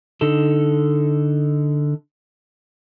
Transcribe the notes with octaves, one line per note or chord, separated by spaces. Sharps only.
D3 D#4 A4